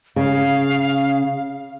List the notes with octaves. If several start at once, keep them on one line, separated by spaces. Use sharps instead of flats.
C#3 F5